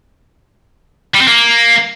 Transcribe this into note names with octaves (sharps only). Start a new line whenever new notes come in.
G3
C4
A#3